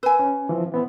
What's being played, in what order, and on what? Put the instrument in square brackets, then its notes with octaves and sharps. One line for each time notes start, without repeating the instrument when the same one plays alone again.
[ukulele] B4 G#5 [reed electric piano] E6
[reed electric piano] C#4
E3 F3 C4
E3 B3 C4